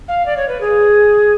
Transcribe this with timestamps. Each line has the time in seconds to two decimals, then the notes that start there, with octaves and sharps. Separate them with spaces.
0.08 F5
0.26 D5
0.37 C#5
0.48 B4
0.61 G#4